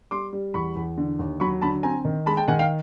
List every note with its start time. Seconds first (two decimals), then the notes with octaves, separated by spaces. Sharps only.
0.11 G3 C6 D6
0.33 G3
0.54 E2 B5 C#6
0.76 E2
0.98 D3
1.19 D#2
1.40 F#3 B5 C#6
1.61 D3 A5 B5
1.83 C4 G#5 A#5
2.05 D#3
2.26 G#3 A5 B5
2.37 G5 A5
2.48 D#3 F#5 G#5
2.59 F5 G5